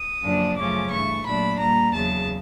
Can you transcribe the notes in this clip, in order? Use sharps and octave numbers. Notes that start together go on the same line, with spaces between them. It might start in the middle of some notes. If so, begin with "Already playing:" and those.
Already playing: D#6
F#2 D3 F3 A#3 D4
F#2 C#3 F3 A3 C#4 D6
G2 E3 A3 C#6
A#2 F#3 A3 D4 B5
A#2 G3 A#3 A#5
E2 C#3 F#3 A5